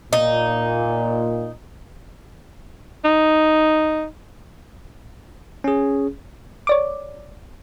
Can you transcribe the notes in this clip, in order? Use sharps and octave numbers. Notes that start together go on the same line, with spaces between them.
A#2 D#4
D#4
C#4 G#4
C#5 D5 D6